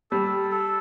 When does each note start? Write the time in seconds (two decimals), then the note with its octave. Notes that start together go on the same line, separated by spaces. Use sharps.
0.11 G3 A4
0.51 A4